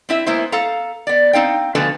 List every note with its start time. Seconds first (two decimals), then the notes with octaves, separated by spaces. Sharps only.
0.09 C4 E4 E5
0.26 G#3 A#3 B3 E4 B4 C5
0.52 A4 F5 A#5
1.07 B3 D5
1.33 C4 D#4 F5 G5
1.75 B2 D3 F3 A3 B4 G#5